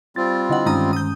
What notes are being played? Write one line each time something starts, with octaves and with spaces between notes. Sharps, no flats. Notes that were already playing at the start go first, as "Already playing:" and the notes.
G3 C4 F4 A6
D3 E4 D#5 F#5
G2 D#3 G#3 C#4 A#5 D#6
D#6 G6